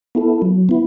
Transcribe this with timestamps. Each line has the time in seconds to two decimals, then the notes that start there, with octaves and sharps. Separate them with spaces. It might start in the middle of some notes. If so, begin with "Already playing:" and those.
0.15 B3 E4 A4
0.42 F#3
0.69 B3 E4